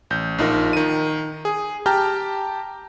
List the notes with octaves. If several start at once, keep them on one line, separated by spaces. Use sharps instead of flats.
A1 G6
A#1 D#4 F4 A#4
D#3 D#7
G#4
G4 G5 A5 A#5 F6 G6